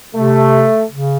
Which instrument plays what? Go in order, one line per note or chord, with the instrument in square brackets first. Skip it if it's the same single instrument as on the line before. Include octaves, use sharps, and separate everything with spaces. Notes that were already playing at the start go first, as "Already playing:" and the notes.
[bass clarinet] C3 [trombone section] A3
[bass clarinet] C#3